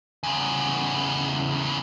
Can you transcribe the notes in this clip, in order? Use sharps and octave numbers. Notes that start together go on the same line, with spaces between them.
E2 C#3